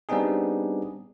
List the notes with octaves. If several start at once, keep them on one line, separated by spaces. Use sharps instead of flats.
G3 B3 C4 D4 D#4 G#4